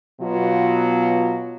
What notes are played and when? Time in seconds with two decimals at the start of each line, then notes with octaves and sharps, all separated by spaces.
0.21 B2 F#3 F4